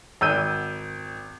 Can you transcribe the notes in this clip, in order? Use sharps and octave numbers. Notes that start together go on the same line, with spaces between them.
G#1 E6 G6 D#7